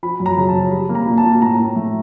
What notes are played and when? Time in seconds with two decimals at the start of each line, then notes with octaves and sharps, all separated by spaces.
0.03 F3 B5
0.20 F#2
0.26 A#5
0.38 C#3
0.48 A5
0.55 F3
0.71 G3 B5
0.89 A#3
0.95 A#5
1.07 A#2
1.18 A5
1.25 A#2
1.41 A2 A#5
1.59 A2
1.76 A3